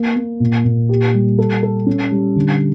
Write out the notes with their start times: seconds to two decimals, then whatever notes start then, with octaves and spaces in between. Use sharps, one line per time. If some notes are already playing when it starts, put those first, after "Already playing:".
Already playing: A#3
0.16 A#3
0.40 A#2
0.65 A#2
0.89 G4
1.14 G3
1.39 A4
1.63 A4
1.86 C#4
2.11 G3
2.36 D3